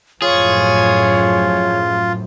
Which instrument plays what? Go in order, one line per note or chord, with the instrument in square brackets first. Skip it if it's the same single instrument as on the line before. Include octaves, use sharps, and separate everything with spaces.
[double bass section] F#2 A2 F3 [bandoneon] F4 [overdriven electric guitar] G#4 [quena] C#5